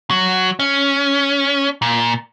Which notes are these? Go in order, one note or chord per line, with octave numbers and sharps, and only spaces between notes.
F#3
C#4
A#2